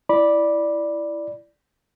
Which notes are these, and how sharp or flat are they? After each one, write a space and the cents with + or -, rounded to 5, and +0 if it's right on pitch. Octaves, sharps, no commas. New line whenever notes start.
E4 +10 D5 +0 B5 -15